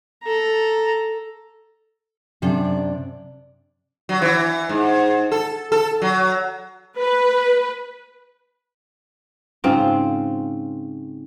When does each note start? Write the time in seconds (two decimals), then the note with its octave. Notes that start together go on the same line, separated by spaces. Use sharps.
0.24 A4 A#5
2.42 F#2 C3 D4 D5
4.09 F#3
4.22 E3
4.69 G#2
5.32 A4
5.72 A4
6.02 F#3
6.98 B4
9.64 G#2 C#3 C4 F4